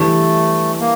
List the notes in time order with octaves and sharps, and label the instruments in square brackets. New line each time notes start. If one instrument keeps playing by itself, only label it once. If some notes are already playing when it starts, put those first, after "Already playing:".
Already playing: [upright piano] E3 G3 D4 [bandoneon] A3
[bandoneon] A#3